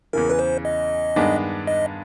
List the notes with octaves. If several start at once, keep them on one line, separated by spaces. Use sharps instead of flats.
E2 C#3 E3 A#4
B4
C5
D#5
G2 D#3 G#3 B3 D4
D#5